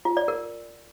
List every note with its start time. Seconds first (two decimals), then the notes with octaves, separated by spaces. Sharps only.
0.05 F4
0.17 D5
0.28 A#4